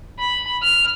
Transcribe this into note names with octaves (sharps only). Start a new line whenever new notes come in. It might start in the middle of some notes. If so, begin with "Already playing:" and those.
B5
F6